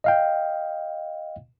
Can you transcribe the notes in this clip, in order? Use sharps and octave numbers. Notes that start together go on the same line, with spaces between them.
D#5 F5 G5